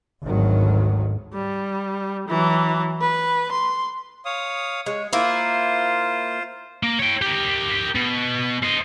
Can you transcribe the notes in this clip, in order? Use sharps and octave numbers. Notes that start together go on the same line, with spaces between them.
G#1 D2 D#3 F#3
G3
E3 F#3
B4
C6
C#5 F5 D#6
G#3 C#5
A#3 E4 F4 C5
A#3
C#5 G5
G4 A#4
B2
C5 D#5